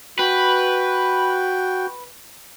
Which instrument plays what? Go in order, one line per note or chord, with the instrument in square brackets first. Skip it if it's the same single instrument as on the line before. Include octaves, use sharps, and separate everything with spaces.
[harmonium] F#4 G5 [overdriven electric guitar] B4